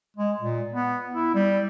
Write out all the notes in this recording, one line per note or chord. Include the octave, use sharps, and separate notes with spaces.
G#3
A#2
B3
E4
G3